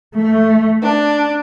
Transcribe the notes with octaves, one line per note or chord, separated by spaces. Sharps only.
A3
D4